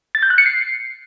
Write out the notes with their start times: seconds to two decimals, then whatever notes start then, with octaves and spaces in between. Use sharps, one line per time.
0.15 A6
0.23 G6
0.30 F#6
0.38 C#7
0.46 C7